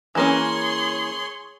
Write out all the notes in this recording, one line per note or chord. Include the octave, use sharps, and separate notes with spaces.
E3 A#3 C#4 G#4 C#5 C6